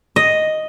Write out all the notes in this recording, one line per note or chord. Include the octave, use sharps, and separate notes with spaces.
D#5